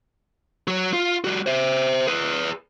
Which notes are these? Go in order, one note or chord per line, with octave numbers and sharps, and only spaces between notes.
F#3 F#4
F4
G3 F#4
C5 E5
G#4 B4